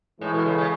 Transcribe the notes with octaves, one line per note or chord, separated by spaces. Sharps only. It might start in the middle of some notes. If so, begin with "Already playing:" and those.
A2 E3 G#3
B2
C#3
C#3